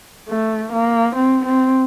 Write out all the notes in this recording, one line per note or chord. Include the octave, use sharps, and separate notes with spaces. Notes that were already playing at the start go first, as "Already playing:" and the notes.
A3
A#3
C4
C4